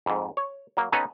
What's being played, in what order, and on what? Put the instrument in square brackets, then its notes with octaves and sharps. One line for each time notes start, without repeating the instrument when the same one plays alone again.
[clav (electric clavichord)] F2 G#2
C#5
F#3 A#3
B3 C#4 D#4 A4 B4 C#5